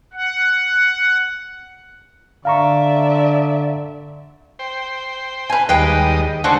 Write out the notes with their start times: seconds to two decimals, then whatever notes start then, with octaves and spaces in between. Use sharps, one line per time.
0.13 F#5
2.45 D3 D5 E5 F5 A#5 C#6
4.59 C5 G5
5.50 B4 G#5
5.69 D#2 G3 G#3 B4 D#5 G5
6.44 D3 G#3 D4 F#4 A4 C5